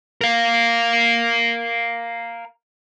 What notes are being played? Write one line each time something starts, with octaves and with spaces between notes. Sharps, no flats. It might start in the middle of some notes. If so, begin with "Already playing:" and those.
A#4 F5